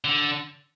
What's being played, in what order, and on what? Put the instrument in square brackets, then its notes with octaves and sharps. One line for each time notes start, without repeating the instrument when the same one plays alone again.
[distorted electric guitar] D3